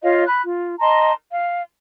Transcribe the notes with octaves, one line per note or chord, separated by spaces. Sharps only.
F4 C#5 D#5 F5
B5 F#6
F4
D#5 A5 A#5 C6
F5